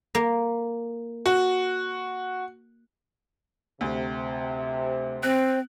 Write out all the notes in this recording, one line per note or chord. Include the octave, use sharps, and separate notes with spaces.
A#3
F#4
D2 C3
C4 C5 F#6